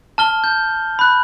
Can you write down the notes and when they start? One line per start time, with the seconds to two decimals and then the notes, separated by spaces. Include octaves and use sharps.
0.18 A5 F6 G7
0.44 G6
0.99 B5 F#6